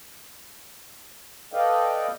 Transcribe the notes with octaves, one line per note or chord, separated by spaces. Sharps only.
A4 B4 D5 D#5 F5 G5